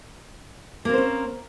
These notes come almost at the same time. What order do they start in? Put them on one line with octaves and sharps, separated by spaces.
A#3 C4 C5 C#4